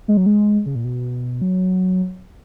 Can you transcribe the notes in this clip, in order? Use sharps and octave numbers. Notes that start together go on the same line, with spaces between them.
G#3
F#3
G#3
C#3
A#2
B2
F#3